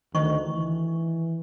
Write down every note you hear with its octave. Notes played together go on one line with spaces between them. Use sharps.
D2 D#3 C5 D#5 C#6
E3